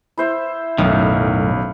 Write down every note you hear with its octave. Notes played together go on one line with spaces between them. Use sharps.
E4 C5 E5
B1 F#2 A2 D#3